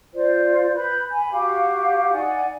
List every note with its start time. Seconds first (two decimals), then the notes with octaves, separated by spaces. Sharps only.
0.13 F4 C5 D5
0.73 B4 B5 G6
1.12 G#5 B5
1.31 F#4 G4 F5
2.11 D#4 D5 F#5 G#5